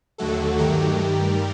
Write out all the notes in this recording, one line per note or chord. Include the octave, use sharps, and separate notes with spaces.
D#2 D3 F#3 A3 F#4 A4
G2 D#3 F#3 A3 G4 A#4
G2 D#3 G3